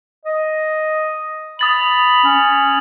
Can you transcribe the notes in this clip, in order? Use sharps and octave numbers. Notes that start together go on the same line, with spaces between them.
D#5
B5 D#6 A6 F#7
C#4